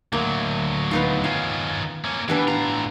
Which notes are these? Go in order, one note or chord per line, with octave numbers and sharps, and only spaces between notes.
D2 F#3 A#3
B3 D#4 F4
D#3 C#4 F4
A#3 C#4
E3 G3 B3 D4
A2 F4 A#5